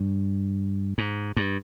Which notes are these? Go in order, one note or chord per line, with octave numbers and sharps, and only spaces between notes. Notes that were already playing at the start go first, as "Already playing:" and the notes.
Already playing: G2
G#2
G2